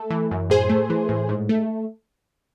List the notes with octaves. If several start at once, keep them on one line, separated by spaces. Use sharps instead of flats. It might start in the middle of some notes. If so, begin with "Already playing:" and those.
Already playing: A3 A4
E3
F#2
A2 G#4 C5
A3
E3
A2
G#2
A3